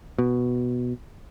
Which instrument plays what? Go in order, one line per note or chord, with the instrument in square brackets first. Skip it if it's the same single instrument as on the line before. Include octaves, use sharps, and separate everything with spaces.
[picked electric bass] B2